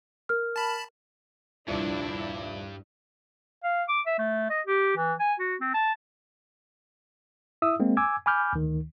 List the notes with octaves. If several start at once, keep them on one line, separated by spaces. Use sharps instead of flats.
A#4 F6
A5 B5
D#1 C2 G2 F3 D4 E4
F5
D6
E5
A3
D#5
G4
E3
G#5
F#4
C4
A5
E4 E5 D#6 E6
G#3 A#3 C4
G#5 D6 E6 G#6
G#5 B5 D6 F6 G6
D2 D#3